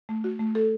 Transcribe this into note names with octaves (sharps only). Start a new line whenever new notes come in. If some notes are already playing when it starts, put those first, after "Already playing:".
A3
F#4
A3
A4